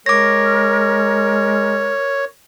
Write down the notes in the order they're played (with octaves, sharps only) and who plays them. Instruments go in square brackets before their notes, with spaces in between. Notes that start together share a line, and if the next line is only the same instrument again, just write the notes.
[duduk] G#3 [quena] A#4 [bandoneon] C#5 [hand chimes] D6 A#6